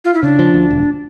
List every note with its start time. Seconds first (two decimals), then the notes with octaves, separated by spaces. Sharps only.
0.05 F4
0.14 E4
0.23 C#3 D4
0.39 F3
0.54 D2
0.71 E1